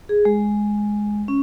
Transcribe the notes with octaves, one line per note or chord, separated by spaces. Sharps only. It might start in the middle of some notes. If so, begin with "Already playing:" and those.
G#4
G#3
C#4